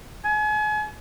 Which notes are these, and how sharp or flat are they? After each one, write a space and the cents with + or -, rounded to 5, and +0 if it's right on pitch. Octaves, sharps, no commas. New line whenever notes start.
G#5 +35